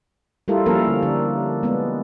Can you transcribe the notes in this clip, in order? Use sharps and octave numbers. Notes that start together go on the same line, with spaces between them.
G3 A3 E4 F4 A4 A#4
F3 G3 A#3 C#4 A4 A#4
D3
D3 D4
G#3 B3 D4